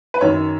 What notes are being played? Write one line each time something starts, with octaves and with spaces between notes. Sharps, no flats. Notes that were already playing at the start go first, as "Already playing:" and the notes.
B4
F#2 D#3 C#5